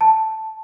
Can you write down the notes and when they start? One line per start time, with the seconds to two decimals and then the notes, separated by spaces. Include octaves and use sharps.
0.01 A5